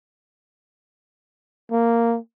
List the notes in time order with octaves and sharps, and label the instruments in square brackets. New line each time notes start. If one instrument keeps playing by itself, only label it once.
[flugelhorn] A#3